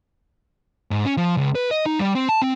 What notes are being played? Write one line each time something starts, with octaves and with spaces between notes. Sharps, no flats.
G#2
C#4
F3
C#2
B4
D#5
D#4
G3
C4
A5
C4